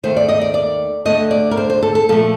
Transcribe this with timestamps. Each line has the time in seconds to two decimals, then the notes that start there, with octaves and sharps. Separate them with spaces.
0.03 D#2 D#3 A3 C5
0.17 D5
0.29 D#5
0.41 D5
0.54 D5
1.05 D2 D3 A3 D#5
1.31 D5
1.51 A#4
1.57 C5
1.70 C5
1.83 A4
1.95 A4
2.09 A#2 F3 A3 A4